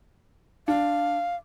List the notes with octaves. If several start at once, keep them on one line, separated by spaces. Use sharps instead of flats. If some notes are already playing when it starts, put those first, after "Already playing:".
D4 F5